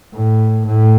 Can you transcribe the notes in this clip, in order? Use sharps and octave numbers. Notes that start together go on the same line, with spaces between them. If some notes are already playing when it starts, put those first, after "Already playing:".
A2
A2